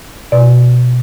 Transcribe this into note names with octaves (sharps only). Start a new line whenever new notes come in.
B2 D5